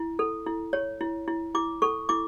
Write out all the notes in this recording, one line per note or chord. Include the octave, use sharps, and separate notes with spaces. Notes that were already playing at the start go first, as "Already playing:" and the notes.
Already playing: E4
A4
E4
C#5
E4
E4
E4 D6
A4 C#6
E4 D6